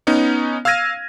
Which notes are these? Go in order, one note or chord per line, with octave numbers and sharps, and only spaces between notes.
B3 C#4 D#4
F5 E6 F6 G#6 A#6 D#7